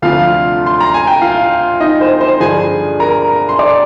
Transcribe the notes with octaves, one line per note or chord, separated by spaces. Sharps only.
D2 C3 F3 F4 F5
C6
A#5
G#5
G5
F4 F5
D#4 D#5
C5
C5
G2 D3 F3 G#4 G#5
A#4 A#5
C6
D5 D6